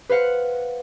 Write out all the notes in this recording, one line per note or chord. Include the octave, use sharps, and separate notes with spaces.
B4 C5 F5 F#5